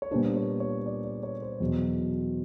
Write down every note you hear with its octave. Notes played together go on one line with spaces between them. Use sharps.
C#5
A#2 G3 B3 D4 F4 C5
C#5
C#5
D5
D5
C#5
C5
E2 B2 F#3